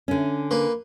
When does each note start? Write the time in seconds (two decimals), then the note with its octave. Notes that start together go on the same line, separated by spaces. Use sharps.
0.08 D3 C#4
0.51 A#3 B4